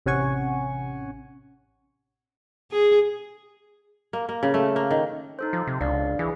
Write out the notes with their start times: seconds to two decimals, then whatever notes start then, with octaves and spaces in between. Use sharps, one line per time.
0.06 A1 C3 C#4 F#5 G#5 C#6
2.71 G#4
4.13 A#3
4.29 A#3
4.43 C#3
4.54 A3
4.76 A#3
4.91 D#3
5.39 D#4 A4 C5
5.53 F3
5.67 C3
5.81 C#2 D4 D5 F5
6.19 E3 G#4